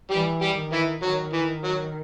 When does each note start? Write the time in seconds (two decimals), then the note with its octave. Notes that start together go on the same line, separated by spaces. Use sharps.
0.11 E3 G3 G4
0.41 G3 G4
0.57 D#3
0.73 E3 E4
1.03 D#3 F#3
1.33 E3
1.64 F#3